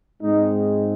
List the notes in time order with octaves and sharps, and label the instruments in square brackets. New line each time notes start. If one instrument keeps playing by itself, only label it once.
[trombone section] G#2 G#3 C4 D#4